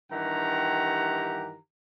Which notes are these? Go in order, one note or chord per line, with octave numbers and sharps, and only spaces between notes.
G2 D#3 E3 G4 F#5 A#5